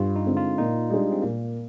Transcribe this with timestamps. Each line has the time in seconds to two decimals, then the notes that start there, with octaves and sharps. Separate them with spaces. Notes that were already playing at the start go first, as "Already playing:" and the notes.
Already playing: G2 F4
0.16 D#4
0.26 D3 G#3 C4
0.37 F4
0.58 A#2 D#4
0.90 G3 G#3 D4 G#4
1.12 C4
1.22 A#2 A#3